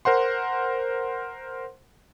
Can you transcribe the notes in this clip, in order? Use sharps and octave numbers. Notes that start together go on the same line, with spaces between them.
A#4 C5 F#5 C6